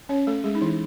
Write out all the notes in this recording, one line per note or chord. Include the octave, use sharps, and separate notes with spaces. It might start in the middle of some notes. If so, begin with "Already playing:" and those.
C#4 C#5
A3 A4
G#3 G#4
D#4
E3 E4